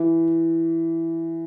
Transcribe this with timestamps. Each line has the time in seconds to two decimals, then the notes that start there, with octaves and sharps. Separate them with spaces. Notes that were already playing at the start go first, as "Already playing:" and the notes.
Already playing: E3